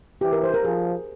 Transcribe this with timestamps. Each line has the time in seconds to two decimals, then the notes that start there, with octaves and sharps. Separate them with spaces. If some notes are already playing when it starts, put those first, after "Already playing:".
0.21 E3 G4
0.33 A#4
0.43 C5
0.54 A#4
0.64 F3 G#4